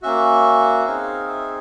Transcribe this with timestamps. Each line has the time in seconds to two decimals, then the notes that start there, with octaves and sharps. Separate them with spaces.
0.02 A#3 C#4 F#4 E5
0.86 C4 D#4 G#4 F5
1.28 E5